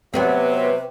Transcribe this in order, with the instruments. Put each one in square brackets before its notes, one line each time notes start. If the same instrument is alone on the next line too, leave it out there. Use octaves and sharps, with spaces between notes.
[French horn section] C3 [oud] F#3 B3 C4 [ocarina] B4